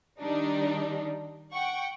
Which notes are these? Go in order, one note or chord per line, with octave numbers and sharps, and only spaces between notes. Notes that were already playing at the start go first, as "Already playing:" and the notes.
D#3 G3 D4 D#4
F#5 G5 C#6